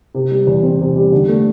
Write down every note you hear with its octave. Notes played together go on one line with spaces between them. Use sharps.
C3
G3
E2
C4
C3
G3
D3
A3